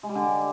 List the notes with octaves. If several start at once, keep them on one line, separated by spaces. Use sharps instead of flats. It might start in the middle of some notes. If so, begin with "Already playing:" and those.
G#3
G3
D3